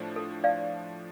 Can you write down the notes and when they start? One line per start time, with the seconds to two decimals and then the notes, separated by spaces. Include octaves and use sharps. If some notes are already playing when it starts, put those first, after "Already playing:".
Already playing: A2 F3 A3 D4
0.16 A4
0.44 D5 F5